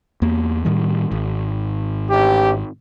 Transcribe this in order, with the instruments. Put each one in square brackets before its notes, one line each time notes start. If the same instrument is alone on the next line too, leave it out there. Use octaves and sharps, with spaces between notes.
[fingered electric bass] E2 A#3
A2 D#3 G3
G#1
[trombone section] A1 G4